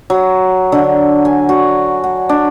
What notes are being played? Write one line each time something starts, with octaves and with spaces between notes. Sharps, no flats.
F#3
D3
G#5
F#4
F#5
D4